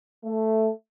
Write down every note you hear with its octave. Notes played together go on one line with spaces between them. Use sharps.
A3